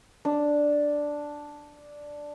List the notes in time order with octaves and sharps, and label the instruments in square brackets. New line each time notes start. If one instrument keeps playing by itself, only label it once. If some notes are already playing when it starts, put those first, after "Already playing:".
[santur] D4